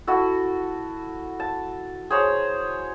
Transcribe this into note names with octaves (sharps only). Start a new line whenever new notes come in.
E4 F#4 A4
A5
G#4 C5 C#5 A#5